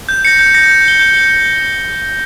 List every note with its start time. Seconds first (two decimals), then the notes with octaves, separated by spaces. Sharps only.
0.09 G6
0.25 A#6 C#7
0.39 G6
0.54 A#6 C#7
0.69 G6
0.85 C#7 G7
0.99 G6
1.14 C#7 G7